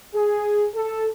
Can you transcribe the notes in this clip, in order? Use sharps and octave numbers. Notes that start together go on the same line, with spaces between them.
G#4
A4